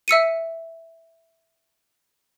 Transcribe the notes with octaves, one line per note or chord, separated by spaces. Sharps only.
E5 E6 C#7 D#7